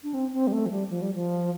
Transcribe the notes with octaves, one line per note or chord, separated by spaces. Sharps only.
D4
C4
C4
G3
A3
F3
G3
F3
G3
F3